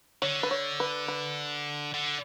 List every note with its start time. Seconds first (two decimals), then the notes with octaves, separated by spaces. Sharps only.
0.22 D3 C#5
0.43 B4
0.51 C#5
0.80 B4
1.08 B4
1.94 D3